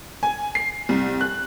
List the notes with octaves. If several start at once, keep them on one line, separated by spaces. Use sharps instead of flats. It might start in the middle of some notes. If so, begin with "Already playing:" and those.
G#5
C7
C2
F#6